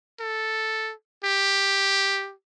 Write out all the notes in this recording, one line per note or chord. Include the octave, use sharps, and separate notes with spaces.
A4
G4